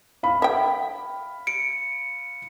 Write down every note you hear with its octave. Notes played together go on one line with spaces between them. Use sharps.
F5 B5
E5 G5
C#7 D7